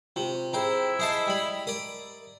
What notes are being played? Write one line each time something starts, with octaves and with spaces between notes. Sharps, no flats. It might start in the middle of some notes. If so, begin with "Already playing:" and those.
C3 F4 G4
C4 E4 G#4 C5 G5 A#5
G#4 C5 D#5 E5 A5 D#6
G3 B5
A#4 D5 D#6